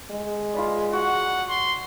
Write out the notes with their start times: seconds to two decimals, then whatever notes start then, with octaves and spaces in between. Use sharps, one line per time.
0.11 G#3
0.54 F4 B4 D5
0.93 F#4 F#5
1.49 C6